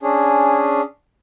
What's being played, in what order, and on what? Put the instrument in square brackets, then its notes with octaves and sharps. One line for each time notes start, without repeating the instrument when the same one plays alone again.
[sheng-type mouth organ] C#4 D4 G#4